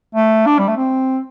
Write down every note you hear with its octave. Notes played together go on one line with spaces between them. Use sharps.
A3
D4
G3
A3
C4